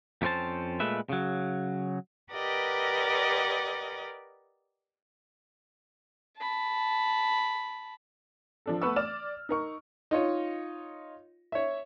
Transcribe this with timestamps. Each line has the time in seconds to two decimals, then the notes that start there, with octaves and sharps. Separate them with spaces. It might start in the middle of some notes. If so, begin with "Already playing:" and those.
0.22 F2 A3 C4 C#4 C5 A5
0.80 A#2 G#3 A3 B4 E5
1.09 C#3 F#3
2.32 G4 A#4 B4 D5 D#5 F#5
6.38 A5 B5
8.66 F3 D4 A4
8.82 A3 B3 B4 C#6 E6
8.96 D5 F6 E7
9.49 D#4 A#4 C#6
10.11 D#4 F4 C#5 D#5
11.52 C#5 E5